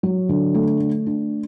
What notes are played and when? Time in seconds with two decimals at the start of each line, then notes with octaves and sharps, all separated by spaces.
0.03 F#3
0.29 D3
0.54 A3
0.80 A3
1.06 D4